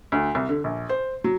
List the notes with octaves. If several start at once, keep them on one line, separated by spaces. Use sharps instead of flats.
D2
C2
D3
A#1
C5
F#3